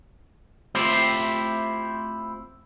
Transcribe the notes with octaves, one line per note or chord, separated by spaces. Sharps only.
A3 C4 E4 F4 G4 C5